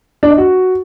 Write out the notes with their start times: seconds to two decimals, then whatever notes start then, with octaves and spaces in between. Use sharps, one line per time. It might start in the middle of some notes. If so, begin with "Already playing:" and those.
0.23 D4
0.30 D#5
0.38 F#4